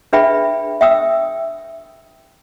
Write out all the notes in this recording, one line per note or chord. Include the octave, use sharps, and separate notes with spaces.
D4 G#4 B4 E5 G5 B5
E5 G5 D#6 E6